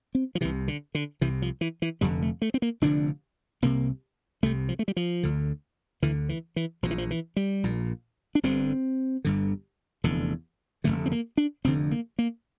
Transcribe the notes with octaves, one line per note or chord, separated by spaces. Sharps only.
C4
F3
C2 C3 E3
D3
D3
C2 C3 E3
F3
E3
E3
F1 F2 D3 G3
A3
A3
C4
A#3
F1 F2 D3 D4
C2 C3 A#3
C2 C3 A3
F3
A3
G3
F3
D2 D3
D2 D3 E3
E3
E3
A#1 A#2 F3
E3
F3
E3
G3
A#1 A#2
D4
G1 G2 D3 C4
G1 G2 D3
F1 E2 D3
F1 E2 D3 A3
C4
A#3
D4
F1 F2 D3 C4
A#3
A#3